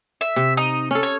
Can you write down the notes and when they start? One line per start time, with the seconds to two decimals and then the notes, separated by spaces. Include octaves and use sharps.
0.21 E5
0.36 C3
0.57 D#4
0.91 C#4 A4
1.03 C#5